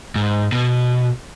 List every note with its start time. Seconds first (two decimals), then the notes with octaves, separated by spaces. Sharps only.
0.16 G#2
0.52 B2